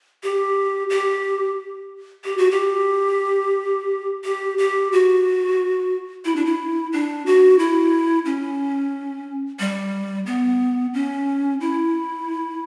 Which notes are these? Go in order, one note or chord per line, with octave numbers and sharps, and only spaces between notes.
G4
G4
G4
F#4
G4
G4
G4
F#4
E4
D4
E4
D4
F#4
E4
C#4
G3
B3
C#4
E4